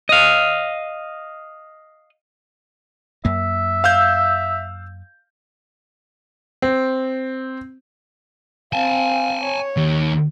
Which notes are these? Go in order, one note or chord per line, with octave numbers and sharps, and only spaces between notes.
D#5 F5
F#2 A#3 E5
F5 E6 G6
C4
C4 F5 G#5 A5
C#5
D#2